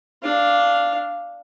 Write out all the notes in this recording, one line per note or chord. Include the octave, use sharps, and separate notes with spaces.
D4 F5